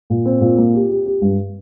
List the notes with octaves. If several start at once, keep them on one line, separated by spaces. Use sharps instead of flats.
A#2
C4
A#2
A#3
G4
G4
G4
G2